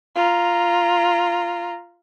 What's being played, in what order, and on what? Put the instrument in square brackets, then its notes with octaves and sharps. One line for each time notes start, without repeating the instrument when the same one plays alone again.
[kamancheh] F4 A#5